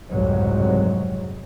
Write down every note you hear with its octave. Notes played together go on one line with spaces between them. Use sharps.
F#1 C2 F2 G#2 F#3 G#3